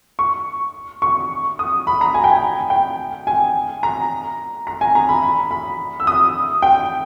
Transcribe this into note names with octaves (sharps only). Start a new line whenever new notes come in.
C#6
C#6
D#6
B5
A#5
G#5
G5
G#5
G5
G#5
A#5
A#5
G#5
A#5
B5
B5
B5
E6
D#6
G5